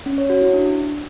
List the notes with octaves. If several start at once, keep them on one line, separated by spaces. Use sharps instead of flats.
C#4
C#5
F#4
E4
D4